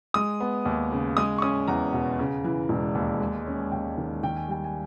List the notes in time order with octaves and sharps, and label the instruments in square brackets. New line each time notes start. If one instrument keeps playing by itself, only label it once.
[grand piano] G#3 D#6
B3
D#2
C#3
G#3 D#6
C#6
C#4 D#6
E2 A#5
B2
C#3
E3
E1
D#2
G#3
C#4
D#2 G5
D#3
D#3 G5
G#5
G3 G5
G#5